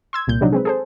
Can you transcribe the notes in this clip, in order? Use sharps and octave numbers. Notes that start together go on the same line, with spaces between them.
C6 E6 G#6
C2 A#2 G6
C3 F3 F#3 D4 D#4
G#3 C4 B4
G#4 A4 C5